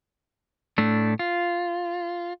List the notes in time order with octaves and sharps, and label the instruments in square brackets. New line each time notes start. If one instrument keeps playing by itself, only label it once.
[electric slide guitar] A2 A3 D4
F4